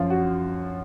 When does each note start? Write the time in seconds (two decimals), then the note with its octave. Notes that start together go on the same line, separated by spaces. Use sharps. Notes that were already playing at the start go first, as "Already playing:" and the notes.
Already playing: F#2 F3 F4
0.10 F#4